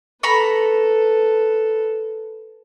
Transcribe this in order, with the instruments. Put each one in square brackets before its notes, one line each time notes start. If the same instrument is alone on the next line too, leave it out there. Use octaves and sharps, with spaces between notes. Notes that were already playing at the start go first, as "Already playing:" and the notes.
[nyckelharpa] A4 B4 [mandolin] A#5 B5 C#6